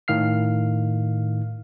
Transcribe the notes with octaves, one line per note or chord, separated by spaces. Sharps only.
A2 D#3 F5 F6 C7